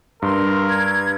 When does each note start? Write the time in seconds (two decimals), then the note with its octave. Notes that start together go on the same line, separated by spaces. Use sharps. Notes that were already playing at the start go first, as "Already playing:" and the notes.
0.22 G2 A#4 C6
0.68 G#6